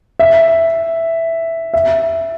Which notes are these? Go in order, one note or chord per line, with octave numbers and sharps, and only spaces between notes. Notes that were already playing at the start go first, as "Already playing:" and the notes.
E5
E5